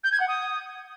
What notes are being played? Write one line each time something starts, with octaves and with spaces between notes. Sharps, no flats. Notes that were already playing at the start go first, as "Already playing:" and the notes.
G6
G#6
F#5
D#6